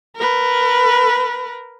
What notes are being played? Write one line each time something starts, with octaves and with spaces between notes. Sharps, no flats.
A#4 B4